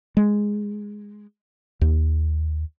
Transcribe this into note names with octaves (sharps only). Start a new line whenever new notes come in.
G#3
D#2